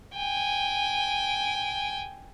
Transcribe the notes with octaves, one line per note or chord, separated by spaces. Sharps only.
G5 G#5